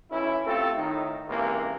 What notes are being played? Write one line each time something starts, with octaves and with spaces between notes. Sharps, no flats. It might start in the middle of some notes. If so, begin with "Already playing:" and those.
B1 C#4 E4
A3 C4 F4 G4 A4
A2 D#3 D#4
C#2 C3 E3 A#3